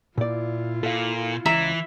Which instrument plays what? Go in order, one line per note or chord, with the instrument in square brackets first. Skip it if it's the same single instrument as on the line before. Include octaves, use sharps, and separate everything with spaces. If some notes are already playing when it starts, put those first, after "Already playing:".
[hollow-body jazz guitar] A#2 D5 [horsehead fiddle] E4 F4
[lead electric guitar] A#2 [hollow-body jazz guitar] A4 F5
[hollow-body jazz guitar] C#2 A#5 [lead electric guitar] E3 [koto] E5